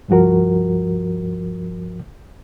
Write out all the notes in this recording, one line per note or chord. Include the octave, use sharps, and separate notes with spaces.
C#2 G2 F3 F#4 A#4